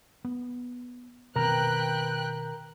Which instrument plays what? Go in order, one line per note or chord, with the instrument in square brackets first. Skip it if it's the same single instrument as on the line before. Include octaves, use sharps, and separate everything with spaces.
[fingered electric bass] B3
[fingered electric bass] B2 D#3 C4 [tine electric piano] A#4 A#5 [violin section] B4 G5 F#6